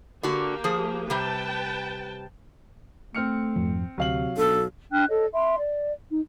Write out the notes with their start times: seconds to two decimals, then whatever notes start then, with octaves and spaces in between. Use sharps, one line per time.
0.23 D3 A#3 F#4 G4
0.64 F3 G#4
1.10 C3 G3 B4 G5 A5
3.15 A3 C4 F6 C#7
3.56 F2 G#2 F3
3.98 D2 C3 F#3 F5 F#7
4.37 B1 B3 D4 A4
4.92 D4 G5 F6 F#6
5.09 A4 C#5 D#5
5.33 E5 B5 C6
5.59 D5
6.10 D#4